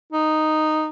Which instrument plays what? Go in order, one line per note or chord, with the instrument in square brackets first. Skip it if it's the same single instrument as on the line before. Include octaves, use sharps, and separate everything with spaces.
[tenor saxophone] D#4